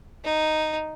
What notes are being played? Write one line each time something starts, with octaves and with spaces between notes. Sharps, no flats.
D#4